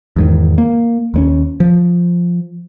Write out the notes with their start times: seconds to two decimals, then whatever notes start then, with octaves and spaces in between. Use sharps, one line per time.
0.16 E2 G#2 D#3
0.58 A#3
1.14 D#2 G#3 C#4
1.60 F3